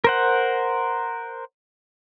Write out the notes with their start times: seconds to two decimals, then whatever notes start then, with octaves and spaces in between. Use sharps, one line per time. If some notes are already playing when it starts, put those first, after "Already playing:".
0.04 A#4 C5 F#5